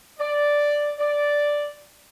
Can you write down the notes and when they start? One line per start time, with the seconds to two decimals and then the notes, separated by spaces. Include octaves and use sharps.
0.19 D5
0.99 D5